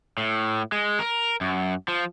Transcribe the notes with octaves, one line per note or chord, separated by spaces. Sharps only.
A2
G#3
A#4
F#2
F3